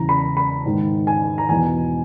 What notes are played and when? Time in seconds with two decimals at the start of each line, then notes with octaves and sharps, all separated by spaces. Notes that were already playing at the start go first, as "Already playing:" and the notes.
Already playing: E2 C#3 E3 A#5
0.09 B5
0.37 B5
0.66 G#2 D#3
1.07 G#5
1.38 A#5
1.49 E2 B2 G#5